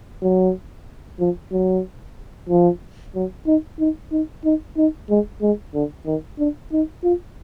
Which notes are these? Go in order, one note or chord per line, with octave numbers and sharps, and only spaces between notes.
F#3
F3
F#3
F3
F#3
D#4
D#4
D#4
D#4
D#4
G#3
G#3
D3
D#3
D4
D#4
F4